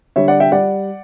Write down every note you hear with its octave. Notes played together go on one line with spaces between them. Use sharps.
D3 G3 C#5 E5
D5 F#5
E5 G5
G3 D5 F#5